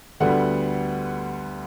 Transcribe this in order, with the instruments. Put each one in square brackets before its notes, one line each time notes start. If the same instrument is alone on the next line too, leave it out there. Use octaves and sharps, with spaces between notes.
[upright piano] D2 D3 G3 B3 F#5